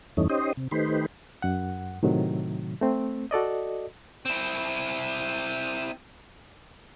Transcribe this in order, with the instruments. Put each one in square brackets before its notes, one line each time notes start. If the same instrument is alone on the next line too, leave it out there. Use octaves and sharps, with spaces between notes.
[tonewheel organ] E2 G2 E3 A3 C#4 D#4
C#4 D#4 G4 C5 D#5
C3
D#3 A3 D#4 G4 B4 C5
[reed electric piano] F#2 F#5
A2 C3 D#3 F#3
A3 C4
F#4 A4 D5 D#5
[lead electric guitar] C4 E4